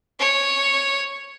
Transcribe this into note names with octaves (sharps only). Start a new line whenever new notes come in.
C#5